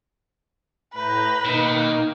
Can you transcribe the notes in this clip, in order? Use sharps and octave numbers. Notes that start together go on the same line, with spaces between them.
A2 B4 A#5 G6
B2 D#3 A#3 D#4